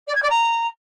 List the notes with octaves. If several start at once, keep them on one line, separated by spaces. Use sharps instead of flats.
D5
G#6
D5
A#5